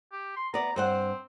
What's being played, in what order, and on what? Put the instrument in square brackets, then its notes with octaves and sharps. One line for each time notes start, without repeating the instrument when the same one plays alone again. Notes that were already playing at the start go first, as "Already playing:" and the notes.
[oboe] G4
C6
[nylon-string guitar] B3 D5 [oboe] A#5
[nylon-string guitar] G2 C5 F#5 [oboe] C4